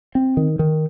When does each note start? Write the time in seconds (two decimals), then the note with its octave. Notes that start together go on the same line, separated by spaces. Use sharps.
0.15 C4
0.37 D#3
0.59 D#3